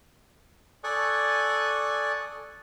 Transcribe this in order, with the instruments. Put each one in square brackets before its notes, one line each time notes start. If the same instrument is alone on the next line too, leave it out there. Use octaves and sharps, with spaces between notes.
[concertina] A4 D5 G#5 C#6 D#6 F#6